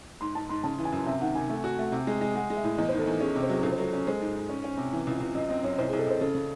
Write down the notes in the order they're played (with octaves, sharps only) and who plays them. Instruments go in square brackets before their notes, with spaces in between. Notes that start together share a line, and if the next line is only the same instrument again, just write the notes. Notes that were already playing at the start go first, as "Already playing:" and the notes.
[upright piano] G#2 [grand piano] C6
[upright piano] G#2 [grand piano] A5
[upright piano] G#2 [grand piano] C6
[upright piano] C#3 [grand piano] A5
[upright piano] E3
[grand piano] G#5
[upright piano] F#2
[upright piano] C3 [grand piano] E5
[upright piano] D#3 [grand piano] F#5
[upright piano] C3 [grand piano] G#5
[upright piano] A3
F#4
A3
C3
G#3
G#3
[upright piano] G#3 [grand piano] F#5
[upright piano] G#3
[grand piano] E5
[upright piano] A2
[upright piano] E2 [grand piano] D#5
[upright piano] D#3 [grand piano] C5
[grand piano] A4
[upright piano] E2
[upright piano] C#4 [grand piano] G#4
[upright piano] C3
[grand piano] C5
[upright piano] F#3 [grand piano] G#4
[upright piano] C#2 [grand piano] A4
[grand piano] C5
[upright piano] F#3 [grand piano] A4
[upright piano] C#4
[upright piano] G#3 [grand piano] C5
[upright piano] G#2
G#2
C#4
C#4
C3
E3
C#2
C#2
[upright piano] F#2 [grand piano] D#5
[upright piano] C4 [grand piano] D#5
[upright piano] F#2 [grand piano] C#5
[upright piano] C2 [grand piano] C5
[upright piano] C2 [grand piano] G#4
[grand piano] A4
[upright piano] C2 [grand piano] C5
[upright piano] C#3 [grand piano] A4
[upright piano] C#3